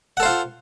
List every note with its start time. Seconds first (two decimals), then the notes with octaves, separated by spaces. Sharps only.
0.17 F#5
0.20 A4
0.23 C5
0.26 F4